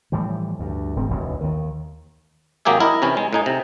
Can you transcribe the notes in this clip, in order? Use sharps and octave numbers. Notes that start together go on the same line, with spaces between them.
A2 E3 F3 G3
D2 G2
D#1 G#2 C4
E1 A1 D2
D#2 D#3
G#1 F#3 A#3 G4 G#4 E5
E4 A#4 D#5
C3 E3 C#4 E4
G#3
A2 D#4 G#5
C3